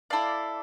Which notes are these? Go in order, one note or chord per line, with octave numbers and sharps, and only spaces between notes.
E4 A4 D5 F5